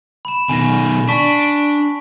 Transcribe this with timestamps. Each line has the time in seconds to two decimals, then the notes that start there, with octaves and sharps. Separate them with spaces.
0.25 B5 E7
0.49 B2 D#3 G#5 A#6
1.09 D4 A5 C#6 B6